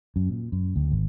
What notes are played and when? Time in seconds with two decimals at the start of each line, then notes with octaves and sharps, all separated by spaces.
0.16 F#2
0.30 A#2
0.52 F#2
0.76 D2
0.91 G#1